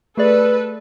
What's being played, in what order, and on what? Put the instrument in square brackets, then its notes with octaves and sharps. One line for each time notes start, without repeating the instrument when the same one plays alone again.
[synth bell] A3 G#4 D5 [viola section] A4 B4